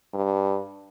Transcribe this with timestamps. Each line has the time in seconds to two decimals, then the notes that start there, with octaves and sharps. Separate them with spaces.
0.14 G2